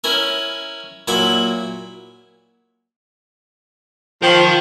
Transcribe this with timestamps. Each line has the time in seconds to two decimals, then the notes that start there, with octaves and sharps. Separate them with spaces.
0.04 C#4 E4 A#4
1.08 A#2 F#3 E4 C#6 D6
4.22 F3 A#4 G5